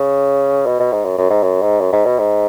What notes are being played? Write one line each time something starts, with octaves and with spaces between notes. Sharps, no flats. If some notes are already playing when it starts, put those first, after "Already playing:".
Already playing: C#3
B2
B2
G#2
F#2
F#2
G#2
F#2
G#2
F#2
G#2
B2
G#2